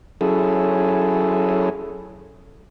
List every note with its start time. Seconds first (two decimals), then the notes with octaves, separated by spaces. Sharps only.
0.21 F#3 C#4 E4 G#4 A4